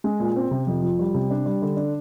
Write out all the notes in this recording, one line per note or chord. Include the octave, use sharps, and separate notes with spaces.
G#3
A#2
C4
C3
F2
F3
G3
C3
D4
G3
D3
D4